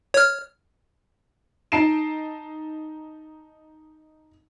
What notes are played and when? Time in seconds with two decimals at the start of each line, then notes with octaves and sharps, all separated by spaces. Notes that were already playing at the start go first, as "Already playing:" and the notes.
0.14 C#5 F6
1.72 D#4 A5 C7 D7 E7